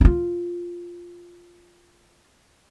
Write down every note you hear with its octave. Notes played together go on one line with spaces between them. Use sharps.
D#4 F4